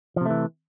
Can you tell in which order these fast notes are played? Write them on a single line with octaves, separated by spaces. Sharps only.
F3 C3 A3 E3